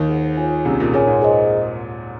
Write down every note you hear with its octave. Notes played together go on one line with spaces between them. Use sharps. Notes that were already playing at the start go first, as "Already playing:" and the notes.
Already playing: D#2 D#3
G#4 C5 F#5
F4 G#4 C#5 G#5
C2 C3 A#3 C#4 G#4
A#2
A#2 G#4 C#5 G#5
G#2
G#4 C5 D#5